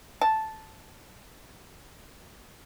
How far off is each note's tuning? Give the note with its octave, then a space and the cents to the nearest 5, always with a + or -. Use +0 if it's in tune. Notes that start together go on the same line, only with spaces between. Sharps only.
A5 -5